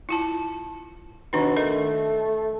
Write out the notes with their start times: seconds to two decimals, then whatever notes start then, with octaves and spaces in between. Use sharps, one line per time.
0.09 E4 F4 A5
1.33 B2 D#3 D4 D#4
1.57 A3 A#4 D#5